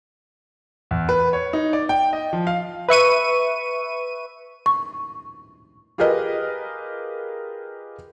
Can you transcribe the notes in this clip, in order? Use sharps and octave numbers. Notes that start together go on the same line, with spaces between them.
E2
B4
C#5
D#4
D5
G5
D#5
F3
F5
B4 E5 C#6 D#7
C#6
F4 G4 G#4 A#4 B4 D#5